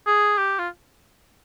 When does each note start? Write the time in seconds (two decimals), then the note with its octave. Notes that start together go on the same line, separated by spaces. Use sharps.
0.07 G#4
0.37 G4
0.59 F4